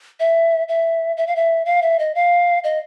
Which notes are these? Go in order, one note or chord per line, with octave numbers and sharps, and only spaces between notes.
E5
E5
E5
F5
E5
F5
E5
D#5
F5
D#5